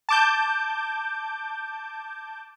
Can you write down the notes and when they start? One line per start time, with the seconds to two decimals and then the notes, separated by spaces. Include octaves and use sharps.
0.09 A5 D6 G6